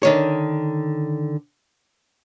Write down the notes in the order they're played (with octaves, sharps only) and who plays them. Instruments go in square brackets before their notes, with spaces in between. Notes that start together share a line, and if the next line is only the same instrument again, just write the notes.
[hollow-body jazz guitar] D3 D#3 C#5